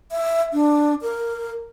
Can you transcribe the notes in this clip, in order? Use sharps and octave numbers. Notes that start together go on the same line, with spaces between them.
E5
D4
A#4